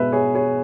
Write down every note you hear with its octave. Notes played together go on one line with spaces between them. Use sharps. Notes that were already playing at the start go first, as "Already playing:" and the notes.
Already playing: B2 G#3 B4 E5
G#4 C#5
G#4 C#5